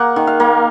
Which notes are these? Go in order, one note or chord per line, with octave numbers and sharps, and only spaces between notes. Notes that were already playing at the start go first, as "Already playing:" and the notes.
Already playing: A#3 F#5
D#3
F5
A#3